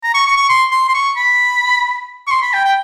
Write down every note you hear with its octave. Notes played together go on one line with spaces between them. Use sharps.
A#5
C#6
C#6
C#6
C6
C6
C6
C#6
B5
C#6
C6
B5
G5
G5